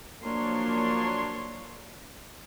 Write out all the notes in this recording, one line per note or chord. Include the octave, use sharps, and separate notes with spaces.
F3 F#3 A#3 D4 C#5 C6